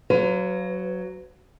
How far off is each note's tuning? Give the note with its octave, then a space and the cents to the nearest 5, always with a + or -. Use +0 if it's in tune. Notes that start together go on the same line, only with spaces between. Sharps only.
F#3 +5 B4 +40 F5 +0